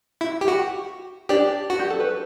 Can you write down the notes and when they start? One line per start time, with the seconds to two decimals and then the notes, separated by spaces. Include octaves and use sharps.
0.21 E4
0.41 G4
0.48 F#4
1.29 D4 G4 D5
1.70 F#4
1.79 G4
1.90 A4
2.00 B4